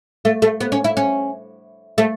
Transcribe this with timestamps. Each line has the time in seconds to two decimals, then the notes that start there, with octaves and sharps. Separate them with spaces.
0.25 A3
0.42 A3
0.60 B3
0.72 C#4
0.84 E4
0.97 C#4
1.98 A3